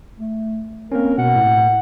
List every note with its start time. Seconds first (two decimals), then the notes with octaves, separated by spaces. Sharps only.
0.18 A3
0.92 A#3 C4 C#4 A#4
1.18 B2 F#5
1.36 A2